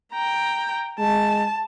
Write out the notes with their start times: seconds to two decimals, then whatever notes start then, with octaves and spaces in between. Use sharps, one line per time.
0.12 G5 A#5
0.99 G#3 A5